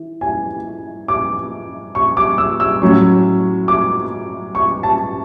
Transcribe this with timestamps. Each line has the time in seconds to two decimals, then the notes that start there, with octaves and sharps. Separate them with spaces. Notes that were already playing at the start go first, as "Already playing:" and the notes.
Already playing: E3
0.21 G#5
1.08 D6
1.95 C#6
2.17 D6
2.38 E6
2.60 E6
2.82 A2 F#3 C#4
3.68 D6
4.55 C#6
4.83 A5